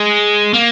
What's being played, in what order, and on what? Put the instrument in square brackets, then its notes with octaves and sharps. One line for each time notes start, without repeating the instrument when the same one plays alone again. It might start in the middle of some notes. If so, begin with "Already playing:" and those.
Already playing: [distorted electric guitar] G#3
A#3